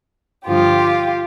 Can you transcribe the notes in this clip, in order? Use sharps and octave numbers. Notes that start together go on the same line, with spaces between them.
G2 D3 F3 F4 G4